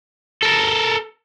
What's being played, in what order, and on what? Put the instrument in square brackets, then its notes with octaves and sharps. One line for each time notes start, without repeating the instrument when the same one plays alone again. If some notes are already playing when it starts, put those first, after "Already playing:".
[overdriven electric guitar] A4 A#4